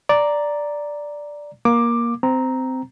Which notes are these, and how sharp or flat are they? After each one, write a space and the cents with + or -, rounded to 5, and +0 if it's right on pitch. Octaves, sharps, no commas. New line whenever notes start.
D5 +0 A#5 +0
A#3 +15 D6 +10
C4 -15 A#5 +0